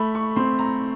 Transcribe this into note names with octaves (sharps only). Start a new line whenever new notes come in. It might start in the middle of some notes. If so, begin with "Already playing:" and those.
Already playing: A3 B5
C#6
C4 C6
A#5